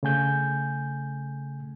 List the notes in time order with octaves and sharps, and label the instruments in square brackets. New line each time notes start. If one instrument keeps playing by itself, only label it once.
[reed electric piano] C#3 A3 G#5 G6